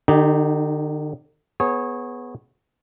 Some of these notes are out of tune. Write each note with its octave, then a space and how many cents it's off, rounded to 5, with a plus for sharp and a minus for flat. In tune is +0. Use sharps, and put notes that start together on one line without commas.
D3 +45 D#4 -5 G4 +0
B3 +0 G#4 +15 C#5 -20